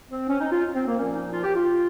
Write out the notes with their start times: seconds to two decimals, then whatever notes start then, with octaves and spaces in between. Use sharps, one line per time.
0.11 C4
0.28 C#4
0.40 D#4
0.51 F4
0.75 C4
0.86 A#3
0.97 A#2 F3 C#4
1.14 D#4
1.33 F4
1.44 G4
1.55 F4